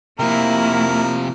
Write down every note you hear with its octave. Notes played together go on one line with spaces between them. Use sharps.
C3 F3 A#3 E4 A#4